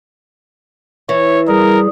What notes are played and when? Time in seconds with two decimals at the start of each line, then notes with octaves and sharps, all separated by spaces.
1.09 E3 C#5
1.48 G3 G#4 A#4